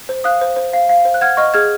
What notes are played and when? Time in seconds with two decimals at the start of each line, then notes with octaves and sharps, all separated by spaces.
0.09 C5
0.24 F5 D#6 F#6
0.41 C5
0.56 C5
0.73 F5
0.89 F5
1.05 C5
1.14 F#6
1.21 F#5 F6 G#6
1.37 D#5 C#6 F6
1.54 G#4 F6 G#6